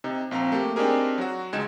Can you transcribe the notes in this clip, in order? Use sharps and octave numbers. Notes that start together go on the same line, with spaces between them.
C3 D#4
A#1 C4 F5 A#5
A3 A#3 G4
C4 D4 D#4 G4 G#4 A#4
F#3 F#4
C#2 G#3 D#4 G#6 E7